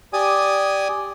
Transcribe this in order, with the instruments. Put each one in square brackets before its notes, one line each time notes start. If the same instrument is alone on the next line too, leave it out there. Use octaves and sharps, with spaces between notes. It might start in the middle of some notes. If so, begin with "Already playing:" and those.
[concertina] G4 D5 G#5 D#6